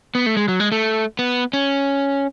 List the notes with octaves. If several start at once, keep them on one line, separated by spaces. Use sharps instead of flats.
B3
A3
G#3
F#3
G#3
A3
B3
C#4